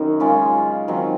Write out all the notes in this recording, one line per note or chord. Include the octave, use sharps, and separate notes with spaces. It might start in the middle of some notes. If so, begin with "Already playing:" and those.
Already playing: F#2 D#3 D#4
C#3 G#3 C#4 F4
D#3 F#3 C4